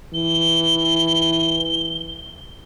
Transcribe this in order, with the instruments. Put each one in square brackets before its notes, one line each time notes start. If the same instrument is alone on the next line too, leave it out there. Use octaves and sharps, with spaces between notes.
[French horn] E3 [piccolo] G7